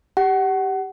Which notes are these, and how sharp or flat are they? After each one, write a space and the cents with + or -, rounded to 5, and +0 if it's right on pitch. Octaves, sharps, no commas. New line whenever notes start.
G4 +0 F#5 +25